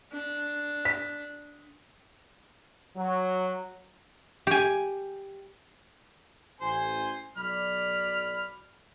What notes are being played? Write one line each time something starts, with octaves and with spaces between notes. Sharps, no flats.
D4
B6
F#3
G4 G#5
A1 C5 G#5
B1 F#3 D5 B5 F6